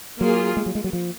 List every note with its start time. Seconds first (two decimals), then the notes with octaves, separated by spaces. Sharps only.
0.21 F#3 A#3 F4 G#4
0.57 G#3
0.66 F#3
0.75 G#3
0.84 F#3
0.93 F3